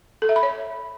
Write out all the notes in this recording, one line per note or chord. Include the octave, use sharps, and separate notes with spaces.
A4
E5
B5
C#5